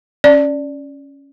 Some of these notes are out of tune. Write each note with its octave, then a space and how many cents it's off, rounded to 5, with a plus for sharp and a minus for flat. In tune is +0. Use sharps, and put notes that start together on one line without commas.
C#4 +0 D5 +0